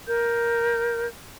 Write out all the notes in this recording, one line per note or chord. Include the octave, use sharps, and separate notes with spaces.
A#4 G6